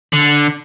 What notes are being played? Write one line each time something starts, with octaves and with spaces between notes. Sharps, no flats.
D3